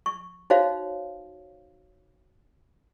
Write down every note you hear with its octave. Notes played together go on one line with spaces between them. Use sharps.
C#6
D#4 F#4 C5 C#5 F5